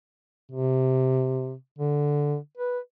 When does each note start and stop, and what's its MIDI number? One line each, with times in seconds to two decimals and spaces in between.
0.52 1.54 48
1.79 2.37 50
2.58 2.79 71